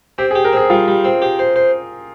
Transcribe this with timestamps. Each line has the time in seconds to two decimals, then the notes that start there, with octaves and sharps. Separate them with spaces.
0.18 C4 G4
0.31 G#4
0.35 G4
0.44 A#4
0.53 C4 G#4
0.70 G3 F4
0.88 G3
1.04 C4
1.22 G4
1.39 C5
1.56 C5